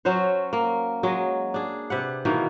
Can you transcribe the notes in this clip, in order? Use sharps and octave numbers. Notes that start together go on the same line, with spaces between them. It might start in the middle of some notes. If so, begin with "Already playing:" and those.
F#3 C#4 F#4 C5
A#3
F#3 G#3 D#5
D4 G#4
C3 B4 F#5
B2 D#3 E3 A#3